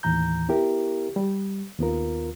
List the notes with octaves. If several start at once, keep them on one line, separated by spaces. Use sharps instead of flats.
D#2 A2 E3 A#5 G6
B3 E4 G4 A#4
G3
D#2 B3 F4 A#4